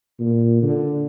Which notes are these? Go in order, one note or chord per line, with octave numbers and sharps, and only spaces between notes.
A#2
D3